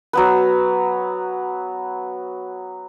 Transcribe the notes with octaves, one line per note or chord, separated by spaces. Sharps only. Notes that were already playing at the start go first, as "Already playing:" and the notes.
F#3 B3 B4